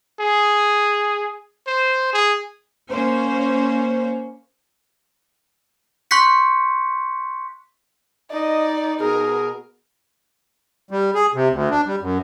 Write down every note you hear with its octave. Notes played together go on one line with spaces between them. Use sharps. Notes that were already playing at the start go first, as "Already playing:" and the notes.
G#4
C5
G#4
A#3 C#4 C5
C6 C#6 F#6 G6 B6 C#7
D#4 D5 D#5
B2 G#4 A#4
G3
G#4
C3
D2
D4
G3
F#2